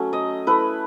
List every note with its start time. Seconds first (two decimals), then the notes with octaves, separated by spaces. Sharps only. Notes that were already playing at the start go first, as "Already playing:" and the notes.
Already playing: F#3 A3 C#4
0.13 D#5
0.47 A3 E4 B4